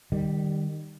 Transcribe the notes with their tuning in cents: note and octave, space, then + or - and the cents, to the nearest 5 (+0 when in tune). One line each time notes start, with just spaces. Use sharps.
D#3 -25 G3 +0